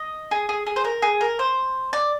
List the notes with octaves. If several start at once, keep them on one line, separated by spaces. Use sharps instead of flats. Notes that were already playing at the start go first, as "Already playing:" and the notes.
Already playing: D#5
G#4
G#4
G#4
C5
A#4
G#4
A#4
C5
D5